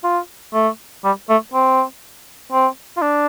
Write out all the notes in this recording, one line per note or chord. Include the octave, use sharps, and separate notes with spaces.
F4
A3
G3
A3
C4
C4
F4
D4